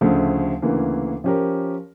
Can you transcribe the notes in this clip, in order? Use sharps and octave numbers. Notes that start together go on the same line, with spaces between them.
D2 C#3 F3 A3
D2 C#3 E3 A#3
F3 C#4 G4 A#4